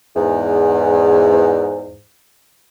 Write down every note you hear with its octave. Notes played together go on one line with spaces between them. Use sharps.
E2 G#2